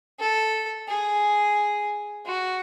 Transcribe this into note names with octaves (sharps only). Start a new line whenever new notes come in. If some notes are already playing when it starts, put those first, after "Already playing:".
A4
G#4
F#4